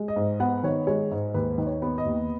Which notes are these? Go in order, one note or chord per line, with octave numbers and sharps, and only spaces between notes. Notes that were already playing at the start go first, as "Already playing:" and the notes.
Already playing: G#3
D#5
G#2
B3 F#5
D#3 C#5
G#3 C#5
G#2
D#2 B4
D#3
C#5
B3
D#5
D#2